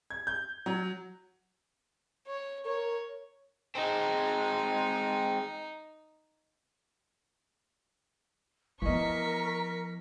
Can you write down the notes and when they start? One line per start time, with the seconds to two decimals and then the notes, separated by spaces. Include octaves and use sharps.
0.10 G#6
0.27 G6
0.66 F#3
2.27 C#5
2.65 A#4 C#5
3.75 G#3 C4 D#4
8.82 E3 F3 B3 A#4 D#5 C#6 B6